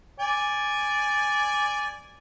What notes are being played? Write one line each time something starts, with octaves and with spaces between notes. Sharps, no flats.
D5 G#5